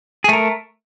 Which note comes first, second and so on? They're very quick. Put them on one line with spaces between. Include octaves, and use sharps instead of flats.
G#4 A3 A#4